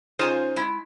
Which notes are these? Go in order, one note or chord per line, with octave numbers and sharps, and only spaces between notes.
C#3 D#4 F4 C5 G#5
G#3 E4